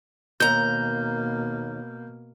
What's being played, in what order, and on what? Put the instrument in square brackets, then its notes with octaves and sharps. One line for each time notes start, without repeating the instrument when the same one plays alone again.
[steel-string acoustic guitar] D#2 A#5 [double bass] B2 A#3 [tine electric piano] G6